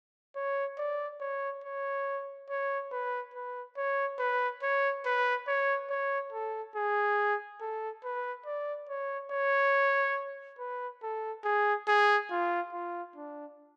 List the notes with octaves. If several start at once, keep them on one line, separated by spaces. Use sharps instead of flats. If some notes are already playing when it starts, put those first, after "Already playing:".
C#5
D5
C#5
C#5
C#5
B4
B4
C#5
B4
C#5
B4
C#5
C#5
A4
G#4
A4
B4
D5
C#5
C#5
B4
A4
G#4
G#4
F4
F4
D4